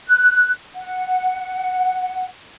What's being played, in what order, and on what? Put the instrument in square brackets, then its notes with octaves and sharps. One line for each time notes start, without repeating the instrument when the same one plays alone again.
[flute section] F#6
F#5